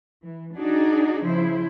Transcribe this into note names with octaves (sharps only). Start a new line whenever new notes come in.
E3
D4 D#4 F#4 G#4 D5
C#3 F3 E4 C5